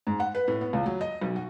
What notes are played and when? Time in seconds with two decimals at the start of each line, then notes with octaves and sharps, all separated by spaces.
0.07 G#2
0.20 F#5
0.35 B4
0.48 A2
0.61 B3
0.73 C#2
0.86 F#3
1.01 D#5
1.22 B1
1.36 F#4